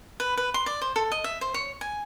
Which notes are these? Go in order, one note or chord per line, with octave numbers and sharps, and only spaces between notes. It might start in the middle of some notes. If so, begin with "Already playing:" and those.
B4
B4
C6
D5
C5
A4
D#5
E5
C5
C#5
G#5